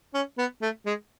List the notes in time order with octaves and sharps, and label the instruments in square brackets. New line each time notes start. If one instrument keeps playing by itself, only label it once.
[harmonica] C#4
B3
A3
G#3